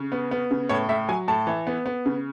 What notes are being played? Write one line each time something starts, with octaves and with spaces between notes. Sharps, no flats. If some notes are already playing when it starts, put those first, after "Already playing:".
Already playing: C#3
B3
B3
C#3
A2 C#5
A2 E5
F#3 G#5
A2 A5
E3
B3
B3
C#3